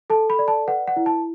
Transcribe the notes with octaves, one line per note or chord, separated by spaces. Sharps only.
A4 A5
B5
D5
A5
B4 F#5
F#5
E4
A5